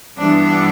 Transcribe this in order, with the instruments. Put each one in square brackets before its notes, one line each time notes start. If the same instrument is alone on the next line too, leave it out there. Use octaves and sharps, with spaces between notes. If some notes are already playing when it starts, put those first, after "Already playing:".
[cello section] G2 E3 B3 D4